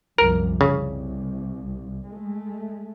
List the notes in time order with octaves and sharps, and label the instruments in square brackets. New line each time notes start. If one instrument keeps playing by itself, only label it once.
[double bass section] C2 F#2 F3 [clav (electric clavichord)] A#4
[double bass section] C2 [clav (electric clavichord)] C#3
[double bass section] G#3 A3